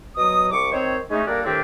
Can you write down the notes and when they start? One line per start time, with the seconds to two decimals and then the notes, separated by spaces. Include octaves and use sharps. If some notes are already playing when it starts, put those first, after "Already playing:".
0.17 B2 F#3 D#5 D#6
0.52 C2 C#6 D6
0.73 D#3 C4 C5 C#5
1.11 G#3 A3 C#4 D#4
1.27 G3 A#3 D4 A4 A#4
1.45 A2 D#3 C4 D4 G4